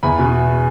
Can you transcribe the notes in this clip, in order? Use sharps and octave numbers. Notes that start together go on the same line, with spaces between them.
E2 G#5 B5
B2